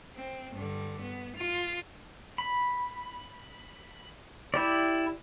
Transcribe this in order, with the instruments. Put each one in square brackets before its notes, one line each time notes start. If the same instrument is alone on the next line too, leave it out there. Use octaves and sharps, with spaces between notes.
[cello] C4
G2 D3
B3
F4
[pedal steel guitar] B5
E4 G4 D5